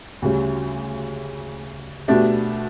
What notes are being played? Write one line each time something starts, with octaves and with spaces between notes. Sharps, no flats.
D2 C#3 G3
B2 A3 D4 G4